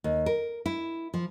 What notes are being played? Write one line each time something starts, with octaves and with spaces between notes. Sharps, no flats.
D#2
A#4
E4
F3